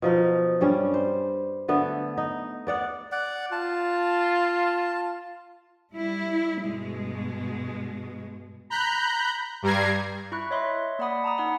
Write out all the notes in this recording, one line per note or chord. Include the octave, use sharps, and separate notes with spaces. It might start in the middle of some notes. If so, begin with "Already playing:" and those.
B2 F3 D#4
G2 G3 C#4
C5
D3 A3 B3
D#4
B3 D5 F#5
D5 F#5
F4 A5
G3 E4
G2 B2 G#3
A#5 B5 F#6 G6
G2 G3 A#5 G#6 C7
E4 B5 C#6 F#6
C#5 D#5 E5 C6
A#3 D5 F#5 B5 D#6
A5 A#5 D#6
D#4 F#5 B5